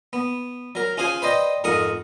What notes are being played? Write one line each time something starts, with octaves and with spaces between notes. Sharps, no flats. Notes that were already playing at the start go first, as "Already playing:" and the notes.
B3
F#3 A#4
C#4 F4 G#4 C5 G#5
B4 C5 D5 D#5 G5
F2 G#2 A#4 F#5 D#6